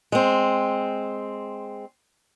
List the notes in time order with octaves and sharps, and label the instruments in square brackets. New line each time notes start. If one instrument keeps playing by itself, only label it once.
[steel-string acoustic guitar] G#3 C4